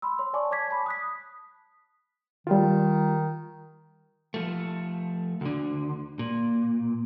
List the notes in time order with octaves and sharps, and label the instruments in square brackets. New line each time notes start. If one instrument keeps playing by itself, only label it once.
[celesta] B5 C6 E6
C#5 C6
C#5 D5 G#5 A5 C#6 D6
C#5 A5 D6 G#6 B6
A5 B5
D#6 F#6 B6
[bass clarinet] D#3 [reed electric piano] G3 F4
[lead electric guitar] F3 A3
D2 D3
A#2